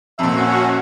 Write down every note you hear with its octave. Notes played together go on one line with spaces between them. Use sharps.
F2 A#2 C#4 F#4 E5